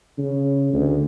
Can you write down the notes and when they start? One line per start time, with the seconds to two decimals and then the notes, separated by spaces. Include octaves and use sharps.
0.18 C#3
0.73 D2